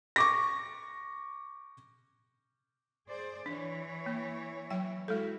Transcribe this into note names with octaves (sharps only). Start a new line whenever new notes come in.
C#6 D6 A#6
G#4 C5 D5
E3 D4 C#5
A#3
F#3 G5
G#3 E4 F#4 A4